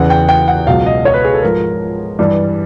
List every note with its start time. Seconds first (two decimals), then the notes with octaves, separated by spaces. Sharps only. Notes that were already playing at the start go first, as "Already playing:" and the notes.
Already playing: E2 C#3 E3 F#5
0.10 G5
0.29 G5
0.48 F#5
0.67 C#2 B2 F#3 F5
0.86 D#5
1.05 C#5
1.14 B4
1.24 G#4
1.34 A4
1.43 G#2 F3 A#4
2.19 G2 E3 G3